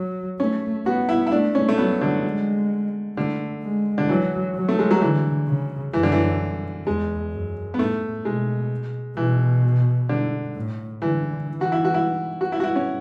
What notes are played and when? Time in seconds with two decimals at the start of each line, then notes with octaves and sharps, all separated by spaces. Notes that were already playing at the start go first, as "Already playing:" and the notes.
Already playing: F#3
0.40 A3 C#4
0.86 B3 F#4
1.09 E4
1.27 E4
1.32 A3 D4
1.55 C#4
1.69 A3
1.78 F#3 B3
2.01 D3
2.25 G#3
3.17 D3 A3
3.63 G#3
3.98 D3
4.09 E3 F#3
4.55 F#3
4.68 A3
4.79 G#3
4.91 F#3
5.01 D3 E3
5.48 C#3
5.93 F#2 E3
6.03 D3
6.12 E3
6.86 E2 G#3
7.32 F#2
7.74 B3
7.78 A2 A3
8.25 B2 G#3
9.17 B2 E3
10.09 D3
10.56 A2
11.02 D3 E3
11.48 E3
11.61 F#4
11.72 E4
11.85 F#4
11.94 E4
12.41 F#4
12.52 E4
12.60 F#4
12.64 E4
12.76 C#4